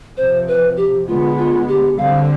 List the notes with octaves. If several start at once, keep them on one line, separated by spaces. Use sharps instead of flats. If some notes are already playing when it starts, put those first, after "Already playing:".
C3 F3 C4 C5
B4
G4
D3 G#3 B3 F4
F4
G4
D3 G3 C4 F5